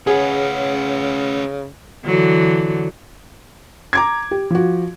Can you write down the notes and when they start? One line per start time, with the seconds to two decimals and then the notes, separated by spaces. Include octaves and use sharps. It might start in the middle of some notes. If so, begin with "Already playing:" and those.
0.07 C#3 C#4 G#4 B4 C#5 F#5
2.05 D3 E3 F#3
3.93 A#5 D6 G#6
4.31 G4
4.50 F3 F#4